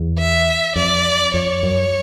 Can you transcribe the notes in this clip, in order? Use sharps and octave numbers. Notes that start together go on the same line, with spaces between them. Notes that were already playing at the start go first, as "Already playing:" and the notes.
Already playing: E2
E5
F2 D5
F2 C#5
F#2